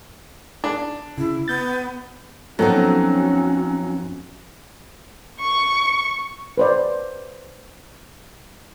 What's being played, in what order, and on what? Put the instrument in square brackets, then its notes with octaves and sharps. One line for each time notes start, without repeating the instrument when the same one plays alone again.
[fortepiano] D4
[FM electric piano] C#3 [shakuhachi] E4
[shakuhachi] B3 [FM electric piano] G6 A6
[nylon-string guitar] F2 B3 D#4 [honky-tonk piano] F#3 [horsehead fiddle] C#4 F#4 [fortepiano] A4
[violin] C#6
[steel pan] B4 C5 D5